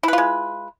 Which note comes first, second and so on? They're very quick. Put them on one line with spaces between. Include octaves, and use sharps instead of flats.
E4 B4 F4 G#3